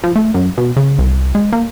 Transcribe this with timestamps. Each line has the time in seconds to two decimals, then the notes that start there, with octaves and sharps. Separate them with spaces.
0.03 F3
0.15 A3
0.34 F#2
0.58 B2
0.76 C#3
0.99 C2
1.35 G#3
1.52 A#3